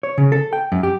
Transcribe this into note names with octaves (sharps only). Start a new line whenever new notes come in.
C#5
C#3
A4
G5
F#2
G4